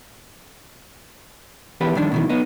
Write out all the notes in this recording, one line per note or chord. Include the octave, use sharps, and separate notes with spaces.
E2 G4 B4
G2 D#3 D4
B2 D#3 E3
B3 D#4